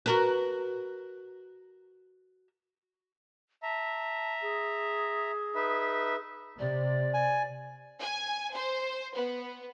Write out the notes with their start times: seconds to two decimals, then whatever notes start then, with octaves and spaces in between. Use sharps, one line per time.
0.06 F#4 A#4 B4
3.63 E5 A5 A#5
4.42 G#4
5.55 D#4 B4 E5
6.59 C3 D5
7.14 G#5
8.01 G#5
8.54 C5
9.16 B3